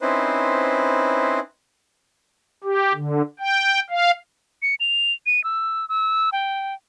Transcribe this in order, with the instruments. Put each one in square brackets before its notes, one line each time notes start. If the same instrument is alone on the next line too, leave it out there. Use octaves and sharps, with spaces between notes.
[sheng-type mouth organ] C4 C#4 D#4 E4 B4 C5
[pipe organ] G4
D3
G5
F5
[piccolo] C#7
F7
D#7
E6
E6
G5